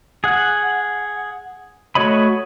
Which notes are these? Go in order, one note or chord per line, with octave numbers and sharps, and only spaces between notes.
G#4 F#5
A3 F#4 C#5 D#5 B5